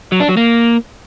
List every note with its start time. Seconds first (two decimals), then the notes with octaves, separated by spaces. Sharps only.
0.12 F#3
0.20 D4
0.29 F#3
0.37 A#3